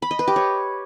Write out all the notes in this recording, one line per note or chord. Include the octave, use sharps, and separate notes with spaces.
B5
D#5
B4
G4
C#5